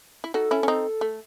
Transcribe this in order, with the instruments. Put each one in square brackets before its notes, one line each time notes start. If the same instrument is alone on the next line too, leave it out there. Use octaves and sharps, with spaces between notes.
[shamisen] E4
[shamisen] D#4 F#4 [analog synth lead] A4
[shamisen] C#4 E4
C#4
C4 D#4
A3